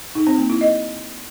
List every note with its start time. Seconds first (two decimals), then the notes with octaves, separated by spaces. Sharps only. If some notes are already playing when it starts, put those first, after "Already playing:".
0.15 D#4
0.27 C4
0.38 A#3
0.50 E4
0.61 D#5